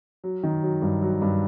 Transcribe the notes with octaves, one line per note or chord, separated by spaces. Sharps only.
F#3
D#3
F#3
G2
F#3
G2